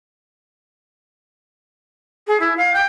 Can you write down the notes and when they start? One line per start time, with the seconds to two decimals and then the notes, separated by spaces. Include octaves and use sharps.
2.27 G#4
2.40 E4
2.57 F5
2.73 G5